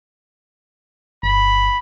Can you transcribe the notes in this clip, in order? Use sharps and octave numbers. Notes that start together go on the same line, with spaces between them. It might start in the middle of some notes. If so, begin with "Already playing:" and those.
G1 B5